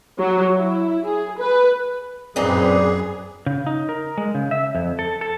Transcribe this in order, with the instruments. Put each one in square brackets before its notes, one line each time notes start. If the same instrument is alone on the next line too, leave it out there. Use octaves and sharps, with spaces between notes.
[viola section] F#3
E4
G#4
B4
[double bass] F#2 [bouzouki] A#2 D#4 [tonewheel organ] C4 B4 [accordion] G#4
[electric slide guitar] C#3
D#4
A#4
G#3
C#3
E5
F2
A4
A4